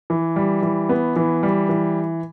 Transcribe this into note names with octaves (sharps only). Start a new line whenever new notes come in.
E3
G3
E3
B3
E3
G3
E3